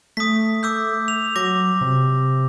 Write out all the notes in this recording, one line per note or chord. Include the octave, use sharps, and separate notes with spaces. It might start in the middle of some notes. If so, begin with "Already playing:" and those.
A3 D#6 B6
D6 E6 G6
F7
F#3 D6 A#6
C3